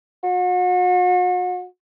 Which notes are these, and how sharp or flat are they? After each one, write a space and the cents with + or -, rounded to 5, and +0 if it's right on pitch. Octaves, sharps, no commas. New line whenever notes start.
F#4 -40